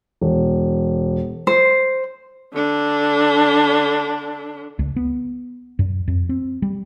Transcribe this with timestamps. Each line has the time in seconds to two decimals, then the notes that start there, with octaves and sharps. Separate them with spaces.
0.21 E1
1.47 C5
2.53 D3 D4
4.79 C#2
4.96 B3
5.79 F#2
6.08 F2
6.29 C4
6.62 G3